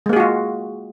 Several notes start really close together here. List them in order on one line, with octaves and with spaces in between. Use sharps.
G#3 A#3 G#4 F#4 F4